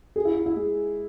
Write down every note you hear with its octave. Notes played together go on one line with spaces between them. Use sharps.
G#4
E4
E4
E4
G#3